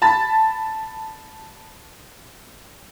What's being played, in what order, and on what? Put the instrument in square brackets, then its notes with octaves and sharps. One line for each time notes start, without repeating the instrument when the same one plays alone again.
[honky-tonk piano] A5 B5 A6